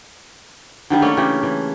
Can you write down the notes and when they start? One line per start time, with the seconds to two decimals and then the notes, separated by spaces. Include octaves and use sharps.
0.90 D3 D#3 G3
1.02 A3 A#3 C#4 A4
1.17 C#3 E3 G4
1.43 E3